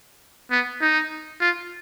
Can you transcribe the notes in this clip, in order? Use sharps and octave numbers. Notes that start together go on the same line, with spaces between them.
B3
D#4
F4